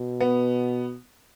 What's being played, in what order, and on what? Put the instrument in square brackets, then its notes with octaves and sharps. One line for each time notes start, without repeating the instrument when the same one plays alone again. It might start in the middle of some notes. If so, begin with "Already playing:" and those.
Already playing: [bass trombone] B2
[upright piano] B3